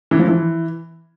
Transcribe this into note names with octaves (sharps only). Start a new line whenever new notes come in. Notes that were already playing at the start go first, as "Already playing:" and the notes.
E3
F3
E3